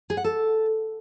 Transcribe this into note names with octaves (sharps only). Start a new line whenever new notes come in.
G#4
F#5
A4